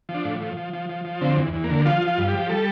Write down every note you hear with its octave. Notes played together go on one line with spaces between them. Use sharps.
F3
D4
A2
F3
F3
F3
F3
F3
D3 C4
E2
E2
A#3
D3
F3 F4
F3
F4
G2
G4
F3
G3 A4